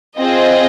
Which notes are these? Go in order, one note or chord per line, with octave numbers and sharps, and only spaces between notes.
C4 F4 G#4 D#5